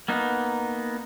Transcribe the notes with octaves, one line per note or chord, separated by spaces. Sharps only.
A#3 B3 D#4